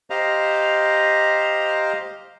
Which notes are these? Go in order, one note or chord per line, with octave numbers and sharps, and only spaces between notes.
G4 C5 D#5 F5 A#5